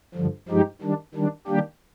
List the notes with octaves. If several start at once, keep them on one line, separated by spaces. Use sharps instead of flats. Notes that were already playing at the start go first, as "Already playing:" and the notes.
G2 D3 F3
G2 F3 G#3 D#4 G4
D#3 G3 D4
D#3 G3 D4
D#3 G3 A#3 D4 G4